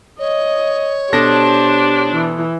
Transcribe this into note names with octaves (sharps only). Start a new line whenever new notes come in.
C#5 D#5
B2 D4 G4 A4 C5 A#6
E3